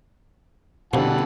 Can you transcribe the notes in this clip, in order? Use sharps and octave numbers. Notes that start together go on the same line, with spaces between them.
A#1 F2 B2 D3 E3 G3 F#5 A5